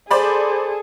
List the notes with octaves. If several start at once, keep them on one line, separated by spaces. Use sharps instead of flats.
G#4 A4 C5 D5 B5